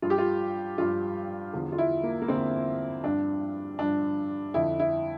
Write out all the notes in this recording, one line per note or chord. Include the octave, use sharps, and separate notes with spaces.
G2 F3 F4
G4
F4
G2 F3 F4
E2 D3 F3
F4
E4
A#3
A#3
E2 D3 F3 C4
G2 F3 D4
G2 F3 D4
F2 D3 F3 E4
E4